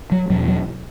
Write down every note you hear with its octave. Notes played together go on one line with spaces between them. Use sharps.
F#3
E2 B2 F#3
F#3